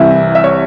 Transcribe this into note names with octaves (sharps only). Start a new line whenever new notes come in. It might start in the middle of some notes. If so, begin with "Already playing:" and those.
Already playing: C2 C3 E3 E4
E5
C#5